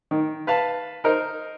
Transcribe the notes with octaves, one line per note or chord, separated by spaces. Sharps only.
D#3
B4 F5 A5
D#4 A#4 C5